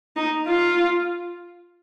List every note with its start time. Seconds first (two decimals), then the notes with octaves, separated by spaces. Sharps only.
0.16 D#4
0.47 F4